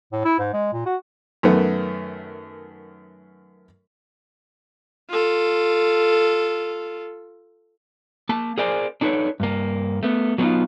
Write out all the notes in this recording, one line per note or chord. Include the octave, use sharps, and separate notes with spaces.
A2
E4
G#2
G#3
A#2
F#4
F#2 D#3 A3 B3
F4 A4
A#3 A5
G#4 A#4 C5 D5 G#5
D4 D#4 A4 B4 C#5
G2 A#3
A3 B3
F#3 A#3 B3 C#4 D#4 F4